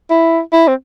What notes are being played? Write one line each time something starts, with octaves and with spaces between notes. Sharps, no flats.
E4
E4
C4